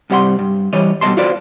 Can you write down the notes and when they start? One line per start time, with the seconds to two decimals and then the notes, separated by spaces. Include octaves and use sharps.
0.10 G2 C3 G3 F#5 A#5 C6
0.39 G2
0.73 E3 G3 C#5 D#5
1.01 B2 G3 A3 D#5 A5 C6
1.17 F4 F#4 B4 C5 D5 F5